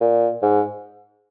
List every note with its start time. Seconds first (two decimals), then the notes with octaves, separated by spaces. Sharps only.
0.01 A#2
0.42 G#2